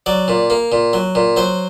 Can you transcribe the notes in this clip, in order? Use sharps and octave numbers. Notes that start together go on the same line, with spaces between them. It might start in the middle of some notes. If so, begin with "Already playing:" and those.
F#3 D5
A#2
A#3
A#2
F#3
A#2
F#3 C5